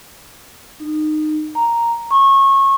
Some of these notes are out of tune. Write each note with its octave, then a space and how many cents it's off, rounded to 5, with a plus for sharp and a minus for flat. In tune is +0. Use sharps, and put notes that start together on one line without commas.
D#4 -20
A#5 +0
C#6 -25